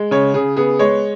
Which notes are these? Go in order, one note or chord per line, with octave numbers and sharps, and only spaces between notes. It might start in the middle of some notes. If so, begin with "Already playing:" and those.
Already playing: G#3
C#3 C#5
C#3 G#4
B3 G#4
G#3 C#5